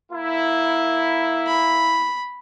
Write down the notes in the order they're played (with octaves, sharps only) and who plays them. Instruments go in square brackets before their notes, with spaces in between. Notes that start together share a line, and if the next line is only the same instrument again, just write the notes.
[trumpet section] A#3 E4
[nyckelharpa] B5